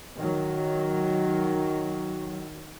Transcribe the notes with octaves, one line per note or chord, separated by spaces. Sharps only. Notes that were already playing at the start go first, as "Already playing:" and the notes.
D#3 F#3